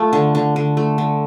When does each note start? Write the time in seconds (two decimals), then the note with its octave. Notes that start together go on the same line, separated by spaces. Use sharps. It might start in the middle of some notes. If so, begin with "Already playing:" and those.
Already playing: A3 F4
0.13 D3
0.35 D3
0.56 D3
0.77 A3
0.98 D3